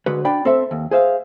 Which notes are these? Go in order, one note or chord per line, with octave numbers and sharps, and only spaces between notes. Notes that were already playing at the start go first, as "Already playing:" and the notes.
D3 G#3 F#4 B4
D4 D5 G5 B5
C4 A4 E5
D#2
G#4 C5 E5 F5